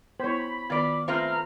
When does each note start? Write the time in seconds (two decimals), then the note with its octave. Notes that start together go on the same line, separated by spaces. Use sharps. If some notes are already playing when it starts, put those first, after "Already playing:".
0.20 B3 E4 C5 C#5 B5
0.70 D#3 B3 F4 D5
1.08 A3 C4 F4 B4 C5 F5 A#5 F6